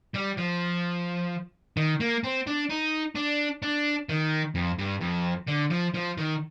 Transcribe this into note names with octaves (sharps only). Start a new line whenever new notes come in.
G3
F3
D#3
A#3
C4
D4
D#4
D4
D4
D#3
F2
G2
F2
D3
F3
F3
D#3